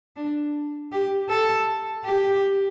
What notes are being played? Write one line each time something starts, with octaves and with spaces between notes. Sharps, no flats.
D4
G4
A4
G4